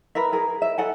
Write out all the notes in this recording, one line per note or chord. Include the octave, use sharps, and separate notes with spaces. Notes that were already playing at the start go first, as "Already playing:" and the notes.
A#4 B4 E5
G#4 A#4
E5
A4 F#5 G#5